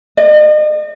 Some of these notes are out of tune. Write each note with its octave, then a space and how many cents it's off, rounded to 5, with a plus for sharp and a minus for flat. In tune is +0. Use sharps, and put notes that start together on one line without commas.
D#5 -40